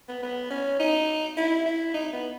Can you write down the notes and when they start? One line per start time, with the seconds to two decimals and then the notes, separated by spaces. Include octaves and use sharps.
0.09 B3
0.22 B3
0.51 C#4
0.80 D#4
1.37 E4
1.66 E4
1.94 D#4
2.13 B3